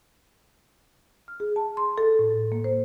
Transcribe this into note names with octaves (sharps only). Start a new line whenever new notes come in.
F6
G#4
A5
C6
A4
A2
A#3
C5